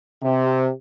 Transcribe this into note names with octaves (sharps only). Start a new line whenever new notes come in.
C3